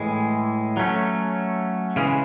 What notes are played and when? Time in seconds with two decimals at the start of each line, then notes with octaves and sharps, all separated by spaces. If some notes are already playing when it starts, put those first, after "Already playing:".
Already playing: A2 E3 G#3
0.77 F#3 A3 C#4
1.96 C#3 E3 G#3 C#4